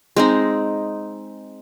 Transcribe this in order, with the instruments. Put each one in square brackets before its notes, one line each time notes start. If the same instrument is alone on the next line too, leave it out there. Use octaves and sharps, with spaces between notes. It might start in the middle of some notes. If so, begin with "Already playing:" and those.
[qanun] G#3 C4 D#4